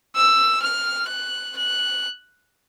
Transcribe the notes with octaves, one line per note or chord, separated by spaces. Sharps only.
E6
F6
F#6
F#6